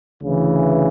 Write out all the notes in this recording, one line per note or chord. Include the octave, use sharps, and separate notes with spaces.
D2 C#3 E3